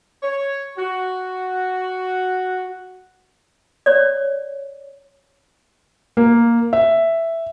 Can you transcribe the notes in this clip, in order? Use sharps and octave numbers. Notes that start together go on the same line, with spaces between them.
C#5
F#4
C#5 D5
A#3
E5